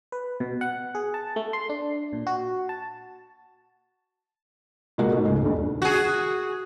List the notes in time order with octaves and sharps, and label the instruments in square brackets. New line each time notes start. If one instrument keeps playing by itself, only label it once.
[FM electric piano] B4
B2
F#5
G#4
A5
A3
C6
D4
A#2
F#4
A5
[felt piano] B2 G#3 A#3 F#4 A#4
G#2 A3
C#2 G#3
D#1 G2
[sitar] F#4 G#4